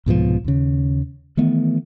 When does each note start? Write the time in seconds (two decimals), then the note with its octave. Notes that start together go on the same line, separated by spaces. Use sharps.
0.06 C2 G#2 B2 F3
0.44 D#2 C#3
1.37 D#3 E3 A3 B3